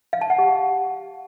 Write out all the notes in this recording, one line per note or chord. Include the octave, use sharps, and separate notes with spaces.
F5
A5
F#5
G4